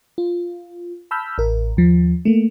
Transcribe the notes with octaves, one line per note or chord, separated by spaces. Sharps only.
F4
A5 B5 E6 F6 G6 B6
A1 A#4
D#2 F3
A3 A#3